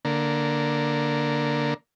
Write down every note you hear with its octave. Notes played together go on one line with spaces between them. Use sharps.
D3 A#3